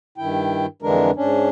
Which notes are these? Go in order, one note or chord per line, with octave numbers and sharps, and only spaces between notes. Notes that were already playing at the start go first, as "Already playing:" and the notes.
G2 D#3 E4 G5
F2 D3 E3 G#3 D4 A#4
G#2 C#4 D4